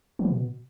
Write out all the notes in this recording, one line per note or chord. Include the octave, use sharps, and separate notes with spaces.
F3
E3
B2